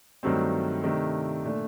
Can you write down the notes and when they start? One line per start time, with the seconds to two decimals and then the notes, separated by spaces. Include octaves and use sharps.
0.23 G2 D#3 F#3 A3 C4
0.83 C3 D#3 A3 D4
1.43 A#2 A3 D4